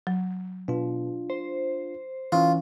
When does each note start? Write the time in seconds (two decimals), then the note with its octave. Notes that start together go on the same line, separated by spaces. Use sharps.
0.07 F#3
0.68 B2 D4 F4
1.30 C5
2.32 E3 C#4 F4